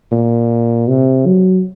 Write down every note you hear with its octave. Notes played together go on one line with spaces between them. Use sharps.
A#2
C3
F#3